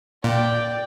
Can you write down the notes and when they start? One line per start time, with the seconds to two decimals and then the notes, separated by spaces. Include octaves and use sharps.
0.24 A#2 D5 G5